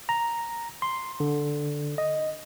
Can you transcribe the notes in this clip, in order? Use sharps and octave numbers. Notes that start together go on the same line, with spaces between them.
A#5
C6
D3
D#5